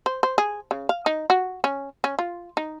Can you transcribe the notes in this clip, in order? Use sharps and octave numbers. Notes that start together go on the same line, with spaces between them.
C5
C5
G#4
C#3
F5
D#4
F#4
C#4
C#4
F4
D#4